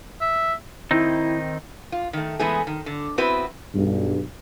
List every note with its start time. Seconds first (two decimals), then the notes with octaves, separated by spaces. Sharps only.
0.21 E5
0.91 D#3 C4 D#4 E4
1.92 F4
2.13 D#3 A3
2.39 E3 G#3 A3 B3 E4 G#4
2.67 D#3
2.86 D3
3.18 B3 C4 E4 F#4 B4
3.74 B1 G2